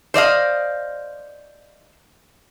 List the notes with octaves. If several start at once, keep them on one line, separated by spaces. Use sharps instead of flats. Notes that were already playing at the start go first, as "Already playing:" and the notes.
C5 D5 D#5 F5